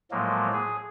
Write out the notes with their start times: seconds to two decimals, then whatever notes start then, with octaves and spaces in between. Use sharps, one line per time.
0.11 A2 F3 F#3 G#3 A#3
0.53 G#4